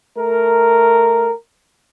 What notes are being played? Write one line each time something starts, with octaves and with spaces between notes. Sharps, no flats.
A3 A#4